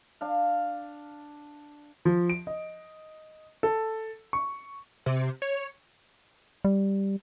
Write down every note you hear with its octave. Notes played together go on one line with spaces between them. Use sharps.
D4 F5
F3
D7
D#5
A4
C#6
C3
C#5
G3